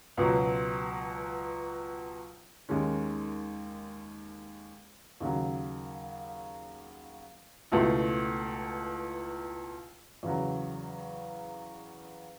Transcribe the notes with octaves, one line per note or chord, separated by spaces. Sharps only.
C#2 B2 F#3
D#2 D#3 G#3 C#4
D#2 C#3 F#3
C#2 B2 A3 E4
E2 C#3 F#3